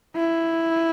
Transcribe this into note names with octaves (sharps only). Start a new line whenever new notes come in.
E4